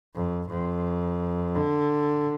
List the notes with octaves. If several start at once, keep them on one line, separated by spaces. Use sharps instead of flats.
F2
F2
D3